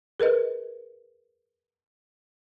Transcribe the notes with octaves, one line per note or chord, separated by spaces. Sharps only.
G#4 A#4 B4 D#5